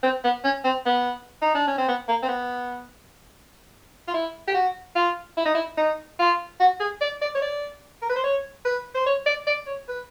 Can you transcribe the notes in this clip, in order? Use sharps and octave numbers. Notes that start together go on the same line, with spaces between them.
C4
B3
C#4
C4
B3
D#4
D4
C#4
C4
B3
A#3
C4
B3
F4
E4
G4
F#4
F4
E4
D#4
E4
D#4
F4
F#4
G#4
D5
D5
C#5
D5
A#4
B4
C5
C#5
B4
C5
C#5
D5
D5
C#5
B4